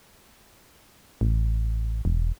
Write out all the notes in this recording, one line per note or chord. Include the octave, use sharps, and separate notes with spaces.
A1
E1